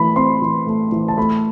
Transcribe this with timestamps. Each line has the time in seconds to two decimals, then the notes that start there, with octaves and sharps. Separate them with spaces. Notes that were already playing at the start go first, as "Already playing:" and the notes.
Already playing: E3 A3 B5
0.16 C4 C6
0.42 E3
0.67 A3
0.92 E3
1.08 A5
1.17 A3 B5